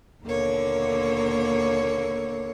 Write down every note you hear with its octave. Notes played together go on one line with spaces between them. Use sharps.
D#2 B2 D3 A#3 C#5